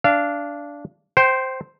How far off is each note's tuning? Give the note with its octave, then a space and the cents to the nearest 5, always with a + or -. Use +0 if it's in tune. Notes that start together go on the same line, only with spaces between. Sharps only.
D4 -15 F5 -25
C5 +0 G5 -20